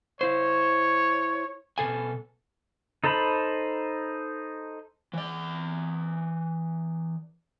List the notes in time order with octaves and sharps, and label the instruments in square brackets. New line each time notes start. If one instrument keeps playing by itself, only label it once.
[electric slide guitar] E4 C5 [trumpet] C#5
[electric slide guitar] B2 A4 G#5
[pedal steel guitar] D#4 A4 C5 A5 B5
[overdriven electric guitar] E3 D5